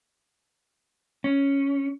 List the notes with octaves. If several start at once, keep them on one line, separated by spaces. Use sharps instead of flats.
C#4